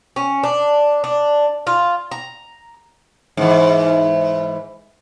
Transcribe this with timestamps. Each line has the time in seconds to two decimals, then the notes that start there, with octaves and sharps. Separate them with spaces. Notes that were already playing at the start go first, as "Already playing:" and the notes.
0.16 C#4
0.43 D4
1.04 D4
1.67 F4
2.11 A#5
3.37 G#2 E3